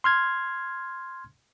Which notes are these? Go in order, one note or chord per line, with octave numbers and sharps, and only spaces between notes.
C6 F6 G#6